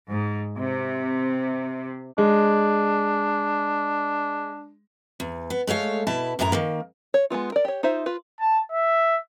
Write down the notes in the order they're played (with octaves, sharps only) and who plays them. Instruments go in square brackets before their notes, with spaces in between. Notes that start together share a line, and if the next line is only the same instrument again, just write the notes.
[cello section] G#2
C3
[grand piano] G#3 [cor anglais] D4
[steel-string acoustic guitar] E2
B3
G#3 A3 C#5 F5
B2 E4 A5
F#2 A2 E4 A5 A#5
D#3 A#3
[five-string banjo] C#5
G#3 A#3 B3 F4
A#4 D5
G4 C#5
D#4 F4 C5 E5
F4 B4
[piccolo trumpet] A5
E5